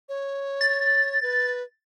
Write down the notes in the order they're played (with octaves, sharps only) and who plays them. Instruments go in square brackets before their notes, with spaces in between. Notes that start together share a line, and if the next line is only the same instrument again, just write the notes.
[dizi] C#5
[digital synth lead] A6
[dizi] B4